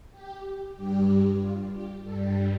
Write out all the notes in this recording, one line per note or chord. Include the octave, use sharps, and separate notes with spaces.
G4
G2 G3 G4
F4
G4
G2 G3 A4